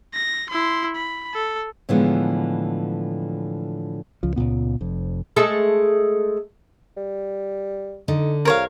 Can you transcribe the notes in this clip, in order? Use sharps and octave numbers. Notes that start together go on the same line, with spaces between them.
A#6
E4 C6
B5
A4
A2 D3 E3 F3 G#3 B3
C#2 F3
C#2 G2 A#2 B3
F1 F2
G#3 A3 A4
G3
D3 D#4
C2 A#4 C#5 F5